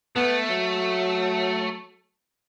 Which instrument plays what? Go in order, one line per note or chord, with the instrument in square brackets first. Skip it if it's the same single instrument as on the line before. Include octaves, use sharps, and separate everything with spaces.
[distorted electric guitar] A3 [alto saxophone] B3
[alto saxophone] F#3